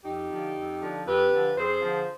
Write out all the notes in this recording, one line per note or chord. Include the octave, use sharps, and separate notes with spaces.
F2 D#4 G4
D3 F3
F2
D3 F3
F2 G4 B4
D3 F3
F2 G#4 C5
D3 F3